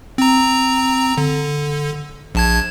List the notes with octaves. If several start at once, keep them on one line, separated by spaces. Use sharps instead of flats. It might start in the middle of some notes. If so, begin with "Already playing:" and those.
C4 A#5
D3
A#1 A5 G#6